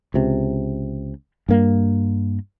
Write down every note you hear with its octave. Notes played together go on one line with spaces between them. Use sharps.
C#2 C3
G2 A#3